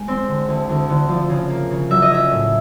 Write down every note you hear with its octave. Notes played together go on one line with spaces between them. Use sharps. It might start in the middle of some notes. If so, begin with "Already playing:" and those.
Already playing: G#3
C4
D3
D2
D2
D3
F3
C#3
A#3
C#3
F#3 E5
D#5
C#4 E5
A2